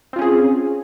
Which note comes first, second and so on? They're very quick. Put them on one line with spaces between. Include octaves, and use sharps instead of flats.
C4 F4 C#4 G#4